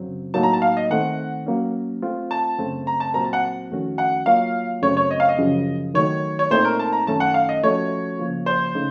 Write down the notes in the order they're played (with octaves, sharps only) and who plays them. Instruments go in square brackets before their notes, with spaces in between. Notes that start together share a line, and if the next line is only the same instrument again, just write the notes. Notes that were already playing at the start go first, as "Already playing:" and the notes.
Already playing: [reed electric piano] F#2 C#3 F#3 C4
[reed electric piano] A2 F#3 A#3 D#4 [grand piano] A5
[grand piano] A#5
A5
F5
D#5
[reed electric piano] D#3 A3 C4 [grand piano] F#5
[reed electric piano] F#3 A#3 C#4
A3 C4 F4
[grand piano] A5
[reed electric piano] F#2 C#3 A3 C4
[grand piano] A#5
A5
[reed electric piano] A#2 F#3 C4 F#4 A#4 [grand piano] A#5
[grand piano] A5
F#5
[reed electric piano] F2 D#3 A3 C#4 F#4
[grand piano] F#5
[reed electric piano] F#3 A#3 F4 A#4 C#5 [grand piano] F5
[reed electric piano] F#2 C#3 A3 C4 [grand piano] C#5
[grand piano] C#5
D#5
F5
D#5
[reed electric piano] F#2 C#3 F3
[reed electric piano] D#3 F#3 A3 [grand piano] C#5
[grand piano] C#5
[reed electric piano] A#2 A3 C4 D#4 [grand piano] C5
[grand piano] A#4
A5
A#5
[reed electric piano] F#2 D#3 A3 C#4 A4 [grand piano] A5
[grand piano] F#5
F5
D#5
[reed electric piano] F3 A3 C#4 F#4 [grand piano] C#5
[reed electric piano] C#3 F3 A#3 F4
[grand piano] C5
[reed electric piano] C#3 A3 D#4